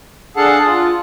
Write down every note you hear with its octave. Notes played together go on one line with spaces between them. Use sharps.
D4 G#4 A4 F5 F#5 A5
F4